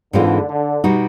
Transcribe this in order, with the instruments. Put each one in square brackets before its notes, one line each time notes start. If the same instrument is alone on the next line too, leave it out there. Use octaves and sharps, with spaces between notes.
[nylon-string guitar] G#2 E3 G#3 C4 F4 [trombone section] D3
[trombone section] D3
[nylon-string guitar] B2 G3 B3 D#4 F#4